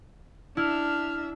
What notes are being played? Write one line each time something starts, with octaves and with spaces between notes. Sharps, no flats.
D4 E4 E5 F6